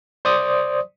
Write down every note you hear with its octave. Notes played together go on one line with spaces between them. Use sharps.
C5 D5 D#6